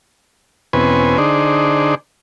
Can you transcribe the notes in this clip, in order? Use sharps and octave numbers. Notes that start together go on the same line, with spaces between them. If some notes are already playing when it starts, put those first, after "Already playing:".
E2 B2 C4 C#4 B4 G#5
D3 D4 D#4 G#4 C5